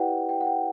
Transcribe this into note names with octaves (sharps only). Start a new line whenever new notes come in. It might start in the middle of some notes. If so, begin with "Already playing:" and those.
Already playing: E4 G4 B4 D5 F#5 G5
G5
F#5
G5